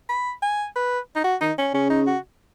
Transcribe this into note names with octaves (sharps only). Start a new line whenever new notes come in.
B5
G#5
B4
D#4
F#4
D#3 D#4
C#4
C#3 C#4
D#4
F#4